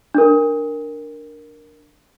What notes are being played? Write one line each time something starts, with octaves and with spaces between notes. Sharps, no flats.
D4 A#4